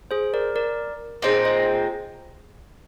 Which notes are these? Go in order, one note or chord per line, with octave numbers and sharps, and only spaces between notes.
G#4 C5
A#4 D5
A#4 D5
A#2 G#3 C4 D#4 C5 D#5
C5 D#5